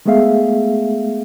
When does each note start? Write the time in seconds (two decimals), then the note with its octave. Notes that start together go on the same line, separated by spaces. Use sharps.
0.06 G#3 A3 B3 G#4 E5 F5